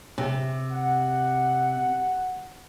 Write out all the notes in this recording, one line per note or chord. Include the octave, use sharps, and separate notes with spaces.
C3
F#5